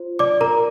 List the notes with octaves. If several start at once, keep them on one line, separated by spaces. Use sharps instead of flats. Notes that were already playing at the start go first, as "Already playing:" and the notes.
Already playing: F4 C5
D5 D6
A#4 A#5